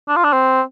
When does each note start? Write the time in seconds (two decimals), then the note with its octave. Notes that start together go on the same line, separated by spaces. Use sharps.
0.08 D4
0.16 F4
0.24 D4
0.32 C4